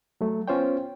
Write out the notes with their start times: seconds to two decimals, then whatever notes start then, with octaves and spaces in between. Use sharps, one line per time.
0.21 F#3 A3
0.48 B3 C#4 F4 C5 C#5 G5